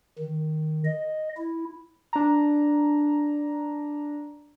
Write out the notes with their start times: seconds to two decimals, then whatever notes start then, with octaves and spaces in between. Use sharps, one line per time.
0.19 D#3
0.85 D#5
1.38 E4
2.13 D4 A#5